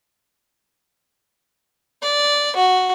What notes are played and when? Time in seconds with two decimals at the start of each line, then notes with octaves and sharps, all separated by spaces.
2.03 D5
2.56 F#4